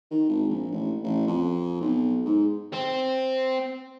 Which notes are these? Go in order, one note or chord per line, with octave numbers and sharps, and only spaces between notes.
D#3
G#1
A#1
A1
A1
F2
B1
G#2
C4